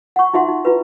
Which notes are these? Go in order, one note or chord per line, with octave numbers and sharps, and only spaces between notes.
F#5 C#6
D#4 F4 E5 F#5 C6
D#4
E4 F4 B4